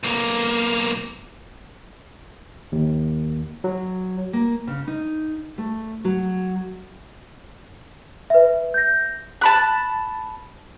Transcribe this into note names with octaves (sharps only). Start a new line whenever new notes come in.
B1 A#3
D#2
F#3
A#3
C#3
D#4
A3
F#3
B4 E5
G6 A#6
A5 B5 F#6